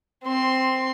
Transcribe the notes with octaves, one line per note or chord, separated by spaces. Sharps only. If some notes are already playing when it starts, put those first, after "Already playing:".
C4 C6